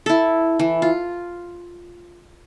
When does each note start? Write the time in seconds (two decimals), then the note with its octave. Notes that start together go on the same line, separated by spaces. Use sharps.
0.06 E4 A4
0.59 E3
0.82 F4